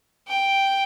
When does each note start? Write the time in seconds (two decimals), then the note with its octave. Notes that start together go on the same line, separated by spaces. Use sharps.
0.28 G5